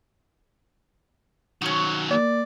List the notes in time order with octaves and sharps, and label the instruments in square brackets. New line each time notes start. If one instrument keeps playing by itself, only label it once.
[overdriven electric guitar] D#3 F#3 [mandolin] C#4 F#4
[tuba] A#3 [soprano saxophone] D5